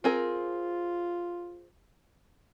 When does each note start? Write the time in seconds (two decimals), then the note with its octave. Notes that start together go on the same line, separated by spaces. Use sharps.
0.04 C4 F4 G#4 A#4